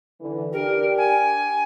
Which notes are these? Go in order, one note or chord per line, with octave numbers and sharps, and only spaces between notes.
D3 E3
D4 G4 A#4
G#5